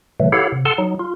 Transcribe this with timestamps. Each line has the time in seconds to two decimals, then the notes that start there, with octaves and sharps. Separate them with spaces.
0.20 A#2 C#3 E3 F#3 A3
0.32 E4 G4 A4 C#5 F5 F#5
0.52 C3
0.65 A4 F#5 A5 C6
0.78 F#3 D#4
0.99 F4